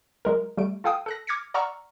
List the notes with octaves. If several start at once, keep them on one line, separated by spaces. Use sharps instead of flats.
F#3 G#3 A#4
G3 A3 D7
F4 A4 F5 G5 D#6
A4 F#6 A#6
D6 F6 G#6 A#6 B6 C#7
D5 F#5 A#5 C#6 E6 F6